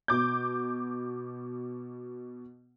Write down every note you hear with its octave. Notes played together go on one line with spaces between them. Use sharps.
B2 D6 G6